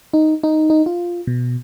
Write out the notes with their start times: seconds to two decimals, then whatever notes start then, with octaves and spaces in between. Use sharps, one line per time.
0.13 D#4
0.43 D#4
0.70 D#4
0.86 F4
1.27 B2